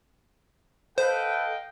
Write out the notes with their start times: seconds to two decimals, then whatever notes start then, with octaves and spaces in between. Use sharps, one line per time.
0.98 A4 B4 C5 D#5 F5 G5